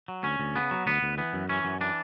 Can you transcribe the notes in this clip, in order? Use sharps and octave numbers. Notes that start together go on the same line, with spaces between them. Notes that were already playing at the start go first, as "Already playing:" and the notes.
F#3
D2 C#4
D2
C#3 B3
F#3
D2 B3
D2
E3 B3
F#2
E3 C#4
F#2
E3 D4